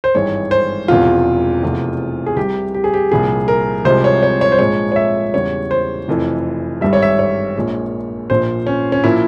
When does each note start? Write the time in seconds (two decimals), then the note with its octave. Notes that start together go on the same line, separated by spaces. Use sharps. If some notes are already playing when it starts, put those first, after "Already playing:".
0.04 C5
0.15 G#1 G2 E3 G#3 C#5
0.51 C5
0.88 E1 E2 C3 F3 F4
1.63 F1 E2 C3 F3
2.26 G#4
2.36 C2 C3 G3 G4
2.74 G4
2.84 G#4
2.94 G4
3.11 C2 A#2 F3 G#4
3.48 A#4
3.85 C2 C3 F3 G#3 C5
4.04 C#5
4.23 C#5
4.41 C#5
4.52 C5
4.59 A#1 G#2 F3 G#3 C#5
4.92 C#5
4.96 E5
5.33 E2 C#3 G3 C#5
5.71 C5
6.08 F1 F2 E3
6.81 G#1 G2 G3 E5
6.93 C#5
7.02 E5
7.19 C#5
7.56 A#1 A#2 G#3
8.30 A#1 A#2 F3 C5
8.67 C#4
8.92 C#4
9.04 A#2 F3 A#3 E4